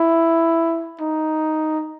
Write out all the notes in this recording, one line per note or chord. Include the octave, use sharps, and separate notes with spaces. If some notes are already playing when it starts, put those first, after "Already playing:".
Already playing: E4
D#4